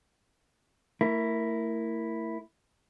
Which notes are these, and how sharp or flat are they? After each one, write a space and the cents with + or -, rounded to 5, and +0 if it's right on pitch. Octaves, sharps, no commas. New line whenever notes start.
A3 +35 E4 +0 A#4 +0